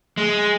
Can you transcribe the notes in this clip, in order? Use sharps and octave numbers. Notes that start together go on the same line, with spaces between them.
G#3